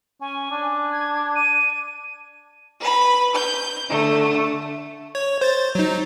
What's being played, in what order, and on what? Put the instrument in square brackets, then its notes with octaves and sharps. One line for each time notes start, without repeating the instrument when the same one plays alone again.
[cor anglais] C#4 [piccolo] G#5
[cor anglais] D4
[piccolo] G#6
D#7
[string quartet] B4 B5
G6
D3 A3
[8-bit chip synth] C#5
C5 A6
F#3 D#4